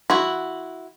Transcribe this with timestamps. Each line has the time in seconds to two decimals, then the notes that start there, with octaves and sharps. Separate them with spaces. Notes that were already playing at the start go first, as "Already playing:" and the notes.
0.10 E4 F#4 C6